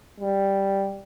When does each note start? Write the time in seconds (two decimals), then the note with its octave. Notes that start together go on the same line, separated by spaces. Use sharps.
0.21 G3